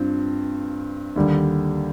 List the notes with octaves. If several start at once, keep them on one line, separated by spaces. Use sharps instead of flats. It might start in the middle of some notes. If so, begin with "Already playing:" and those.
Already playing: G2 C4 F4
D#2 D3 G3